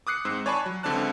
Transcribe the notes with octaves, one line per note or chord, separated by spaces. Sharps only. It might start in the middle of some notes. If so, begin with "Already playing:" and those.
D6 D#6 F#6 C7 C#7
G#2 C4 E6
C#5 D5 G#5 A5 B5 C#6
F#3
C#2 D3 C4 D5 A5 F#6